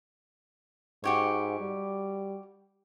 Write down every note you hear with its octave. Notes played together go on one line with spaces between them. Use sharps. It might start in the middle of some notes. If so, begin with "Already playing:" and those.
G#2 F#4 G4 C#5
G3